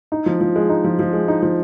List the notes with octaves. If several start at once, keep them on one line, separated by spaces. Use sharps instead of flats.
D#4
F3
F3
G#3
D#4
F3
F3
G#3
D#4
F3